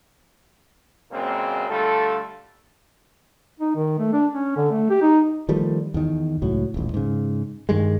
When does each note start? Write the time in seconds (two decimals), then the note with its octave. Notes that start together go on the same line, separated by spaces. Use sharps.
1.12 F#2 A#2 C#3 G#3 A#3 C4
1.69 D3 G3 A3 F4 A4
3.60 D#4
3.76 D#3
3.99 A3
4.13 D4
4.35 C#4
4.56 D3
4.71 A3
4.90 G4
5.02 D#4
5.49 D#3 F3 G3 A3
5.94 E2 D#3
6.42 C#2 A2 F#3
6.74 D#1 A1
6.94 G#2 C#3
7.69 G2 D#3 G3 G#3